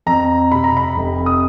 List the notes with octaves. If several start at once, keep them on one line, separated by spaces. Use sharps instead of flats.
F2 A#5
C3 B5
A#5
B5
F1
D#6